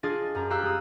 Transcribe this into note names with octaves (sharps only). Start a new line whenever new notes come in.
D4 F4 G#4 D#5 A6
F#2 A#5
G4 F5 A#5 E6 F#6
G#3 D#6